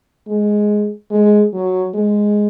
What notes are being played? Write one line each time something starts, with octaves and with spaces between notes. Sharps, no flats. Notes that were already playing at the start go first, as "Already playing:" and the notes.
G#3
G#3
F#3
G#3